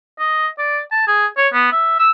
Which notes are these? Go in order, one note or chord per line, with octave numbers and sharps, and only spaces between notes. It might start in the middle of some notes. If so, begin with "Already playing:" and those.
D#5
D5
A5
G#4
C#5
B3
E5
E6